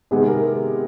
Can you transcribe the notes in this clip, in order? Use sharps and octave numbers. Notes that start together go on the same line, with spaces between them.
C3 D#3 G#3 B3 G#4
A#4